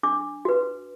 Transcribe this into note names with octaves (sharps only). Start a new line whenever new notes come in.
D4 D6
F#4 B4